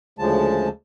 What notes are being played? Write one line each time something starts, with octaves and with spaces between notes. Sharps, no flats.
D2 C#3 F3 G#3 A5